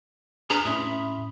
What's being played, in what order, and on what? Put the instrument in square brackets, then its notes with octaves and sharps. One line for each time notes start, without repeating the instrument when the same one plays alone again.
[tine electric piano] D4 F6 [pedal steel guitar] G#4 B4 [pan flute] A#5
[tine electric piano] A2 C#4 [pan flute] E5 [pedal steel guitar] B5 C6 D#6